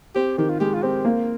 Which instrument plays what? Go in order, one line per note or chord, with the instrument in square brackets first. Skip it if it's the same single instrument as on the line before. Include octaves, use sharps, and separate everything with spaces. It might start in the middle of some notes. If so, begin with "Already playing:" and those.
[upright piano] C4 [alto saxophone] G4
[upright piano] D#3 [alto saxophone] G4
[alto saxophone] F4
[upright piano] G#3 [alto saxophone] G4
[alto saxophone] F4
[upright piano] C4 [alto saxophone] G4
[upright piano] A#3